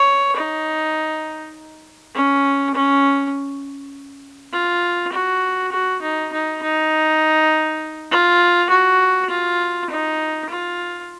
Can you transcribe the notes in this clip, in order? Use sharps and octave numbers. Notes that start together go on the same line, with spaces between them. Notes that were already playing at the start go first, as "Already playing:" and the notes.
Already playing: C#5
D#4
C#4
C#4
F4
F#4
F#4
D#4
D#4
D#4
F4
F#4
F4
D#4
F4